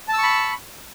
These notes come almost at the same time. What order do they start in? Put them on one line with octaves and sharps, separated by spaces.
A5 E6 C#6 B5